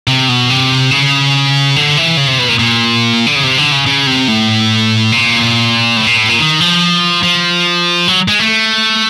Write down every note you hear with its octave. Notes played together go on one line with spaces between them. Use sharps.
C3
B2
C3
C#3
D3
E3
C#3
C3
B2
A#2
A#2
D3
C#3
C3
D3
C#3
C#3
C3
A2
A#2
A2
A#2
A2
A#2
D#3
F3
F3
F#3
G#3
A3